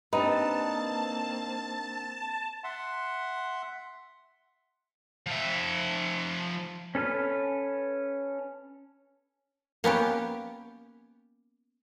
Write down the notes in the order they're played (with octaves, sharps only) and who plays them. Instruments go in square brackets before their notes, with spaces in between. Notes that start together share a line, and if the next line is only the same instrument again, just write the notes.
[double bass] A#3 C4 [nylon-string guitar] D4 G4 B4 [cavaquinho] D#4 [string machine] A5
[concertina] E5 F#5 C6
[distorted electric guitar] F3 E5
[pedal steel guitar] C#4 A4 B4 F6
[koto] A#3 B3 C#4 G4